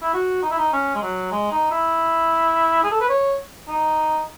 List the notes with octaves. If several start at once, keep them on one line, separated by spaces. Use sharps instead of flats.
E4
F#4
D#4
E4
D#4
C#4
G#3
F#3
G#3
D#4
E4
G#4
A4
B4
C#5
D#4